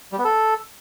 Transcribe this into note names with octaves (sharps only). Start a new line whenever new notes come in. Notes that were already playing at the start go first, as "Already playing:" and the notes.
G3
B3
A4